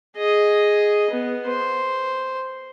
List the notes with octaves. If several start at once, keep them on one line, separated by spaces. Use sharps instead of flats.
G#4 D#5
B3
C5